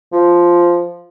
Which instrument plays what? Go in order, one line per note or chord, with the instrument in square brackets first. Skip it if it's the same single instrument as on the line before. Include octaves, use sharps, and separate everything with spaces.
[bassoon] F3